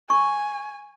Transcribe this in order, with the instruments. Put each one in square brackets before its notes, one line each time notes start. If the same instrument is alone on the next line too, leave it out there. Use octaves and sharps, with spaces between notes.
[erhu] G#5 [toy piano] C#6